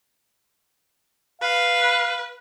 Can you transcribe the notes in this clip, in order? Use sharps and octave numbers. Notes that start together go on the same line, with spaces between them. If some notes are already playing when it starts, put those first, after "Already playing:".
B4 F5